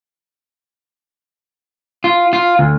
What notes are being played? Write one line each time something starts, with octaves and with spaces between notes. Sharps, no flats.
F4
F4
D2